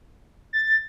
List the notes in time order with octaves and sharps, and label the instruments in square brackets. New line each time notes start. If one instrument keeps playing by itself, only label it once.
[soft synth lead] A6